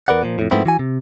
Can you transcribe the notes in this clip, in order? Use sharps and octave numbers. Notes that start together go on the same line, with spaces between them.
E2 A#4 B4 D5 F#5
A#2 F3
F2 A2
G#2 F3 A3 B3 C4 E4
E3 F#4 G#5
C3